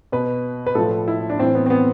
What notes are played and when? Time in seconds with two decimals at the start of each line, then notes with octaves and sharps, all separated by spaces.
0.12 B2 B4
0.66 B4
0.75 A2 F3 A4
1.08 E4
1.30 D4
1.39 A2 E3 C4
1.55 B3
1.66 C4
1.70 B3